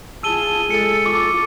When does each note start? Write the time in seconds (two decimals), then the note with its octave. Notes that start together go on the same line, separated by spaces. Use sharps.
0.23 F4 G#4 A5 E6 D#7 G7
0.70 G#3 A4 E6 C#7
1.05 F4 C#6 D6